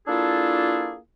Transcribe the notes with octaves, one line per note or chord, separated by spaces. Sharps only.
A#3 D4 E4 F4 G#4 A4